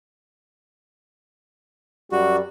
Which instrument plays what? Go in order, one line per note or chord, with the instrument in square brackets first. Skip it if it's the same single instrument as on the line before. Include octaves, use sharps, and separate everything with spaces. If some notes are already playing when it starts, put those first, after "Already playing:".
[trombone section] F#2 G3 [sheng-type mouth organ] F#4